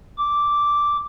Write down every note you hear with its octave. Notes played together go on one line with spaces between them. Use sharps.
D6